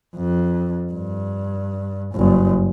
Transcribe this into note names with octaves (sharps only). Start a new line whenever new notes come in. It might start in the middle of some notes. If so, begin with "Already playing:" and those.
F2
G2
F#1 G2